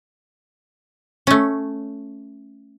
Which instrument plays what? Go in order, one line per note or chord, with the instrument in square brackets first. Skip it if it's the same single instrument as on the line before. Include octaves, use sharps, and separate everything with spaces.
[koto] A3 C#4